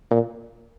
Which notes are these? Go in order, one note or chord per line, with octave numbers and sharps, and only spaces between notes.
A#2